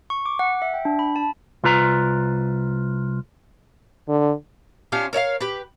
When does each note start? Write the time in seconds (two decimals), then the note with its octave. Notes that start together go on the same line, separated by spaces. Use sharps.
0.10 C#6
0.26 D6
0.39 F#5
0.62 E5
0.74 G5
0.85 D4
0.99 B5
1.16 A5
1.64 C2 F4 B4 A#5
4.09 D3
4.92 C#4 D4 F4 G4
5.13 A#4 C#5 E5 F5
5.41 G4 B4